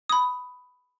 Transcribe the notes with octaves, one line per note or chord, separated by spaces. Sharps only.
B5 D#6